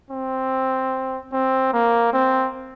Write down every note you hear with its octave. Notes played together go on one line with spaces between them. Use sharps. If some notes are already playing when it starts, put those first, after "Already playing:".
C4
C4
A#3
C4